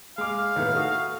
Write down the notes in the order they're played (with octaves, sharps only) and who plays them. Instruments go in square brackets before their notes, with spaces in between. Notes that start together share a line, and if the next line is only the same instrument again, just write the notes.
[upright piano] G#3 D6 [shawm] F5
[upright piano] D#2 A2 B3
A3 F#4 D#6